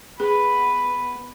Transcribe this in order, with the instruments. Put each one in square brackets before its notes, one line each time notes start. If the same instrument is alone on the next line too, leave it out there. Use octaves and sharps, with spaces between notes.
[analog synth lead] B3 [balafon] G#4 [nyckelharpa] B4